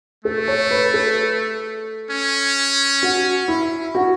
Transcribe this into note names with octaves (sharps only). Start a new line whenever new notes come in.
A3 A4
C#5
B4
A4
C#4
F#4
E4
F#4